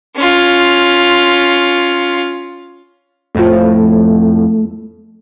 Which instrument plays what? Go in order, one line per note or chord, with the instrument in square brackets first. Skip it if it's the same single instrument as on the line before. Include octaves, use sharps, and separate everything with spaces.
[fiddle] C#4 F4
[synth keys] F2 A2 F3 [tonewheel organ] A3